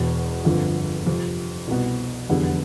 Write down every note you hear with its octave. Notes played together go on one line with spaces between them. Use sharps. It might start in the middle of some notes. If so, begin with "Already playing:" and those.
Already playing: E1 E2 B2
G1 F2 D3 F3
F2 C3 F3
C2 B2 B3
F1 E2 D3 G3 B3